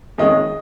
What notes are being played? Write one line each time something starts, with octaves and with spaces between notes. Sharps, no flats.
F2 D#3 G#3 C#4 D#5